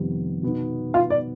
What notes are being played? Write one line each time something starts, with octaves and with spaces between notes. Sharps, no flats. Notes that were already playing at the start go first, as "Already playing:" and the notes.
Already playing: F2 C3 D#3 G3 B3
B2 B3 D#4
F4 F5
D5